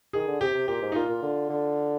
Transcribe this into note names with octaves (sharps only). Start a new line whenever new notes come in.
D#3 G#4
D3
C3 G4
C3
A#2 G4
G#2
D#4
A#2 F4
A#2
D3
D3